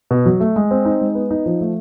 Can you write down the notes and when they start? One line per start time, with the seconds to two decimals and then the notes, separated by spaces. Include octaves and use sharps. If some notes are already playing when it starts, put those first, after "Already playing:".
0.11 B2
0.26 F#3
0.40 A3
0.56 G#3
0.71 C4
0.85 D#4
1.01 G#3
1.15 B3
1.31 D#4
1.46 F3
1.61 A3